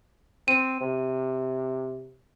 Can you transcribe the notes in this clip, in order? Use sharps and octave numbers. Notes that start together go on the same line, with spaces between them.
C4 D#7
C3